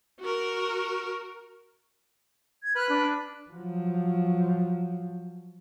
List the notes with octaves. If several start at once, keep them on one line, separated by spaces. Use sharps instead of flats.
F#4 A#4
G#6
B4 F6 F#6
D4
F3 F#3